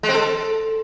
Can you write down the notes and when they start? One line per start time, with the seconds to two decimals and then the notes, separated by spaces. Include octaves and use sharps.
0.03 G#3
0.09 C4
0.14 A4